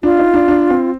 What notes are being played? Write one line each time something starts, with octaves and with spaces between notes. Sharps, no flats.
D4 F4
D#4
D4
D4
C4